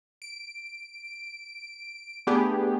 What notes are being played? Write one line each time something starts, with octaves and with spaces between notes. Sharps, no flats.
D7
A3 B3 D4 G4 G#4